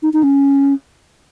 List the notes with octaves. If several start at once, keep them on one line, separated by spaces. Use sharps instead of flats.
D#4
D#4
C#4